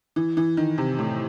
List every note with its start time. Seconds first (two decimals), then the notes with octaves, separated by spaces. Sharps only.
0.16 E3
0.37 E3
0.57 D#3
0.78 C3
0.99 A2